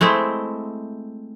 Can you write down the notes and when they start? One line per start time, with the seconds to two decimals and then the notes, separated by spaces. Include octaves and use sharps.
0.01 G#3 A3 C4 E4